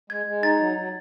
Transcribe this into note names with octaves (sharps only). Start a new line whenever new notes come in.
G#3 G#6
G#3
D#4 A6
F#3
F#3